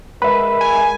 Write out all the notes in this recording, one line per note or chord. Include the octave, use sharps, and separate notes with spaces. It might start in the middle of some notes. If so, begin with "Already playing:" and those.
G#3 A#4 B4 E5 B5
G#5